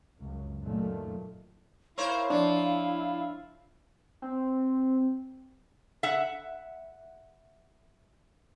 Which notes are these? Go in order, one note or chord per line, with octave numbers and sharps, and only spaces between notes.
C#2 F#2
F#2 A#2 D#3 A3
E4 A#4 C5 C#5 F5
F3 D4
C4
E5 F#5